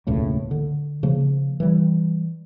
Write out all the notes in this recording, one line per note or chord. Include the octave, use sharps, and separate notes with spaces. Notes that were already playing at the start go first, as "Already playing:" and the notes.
E1 C#2 A2 A#3
D3
C#3 F3 A#3
E3 G3